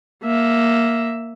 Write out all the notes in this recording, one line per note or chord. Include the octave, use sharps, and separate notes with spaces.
A#3 E5